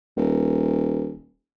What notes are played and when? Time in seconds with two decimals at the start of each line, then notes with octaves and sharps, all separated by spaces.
0.17 D#1